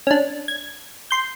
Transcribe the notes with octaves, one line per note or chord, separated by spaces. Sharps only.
C#4 D4
G#6
C6 G6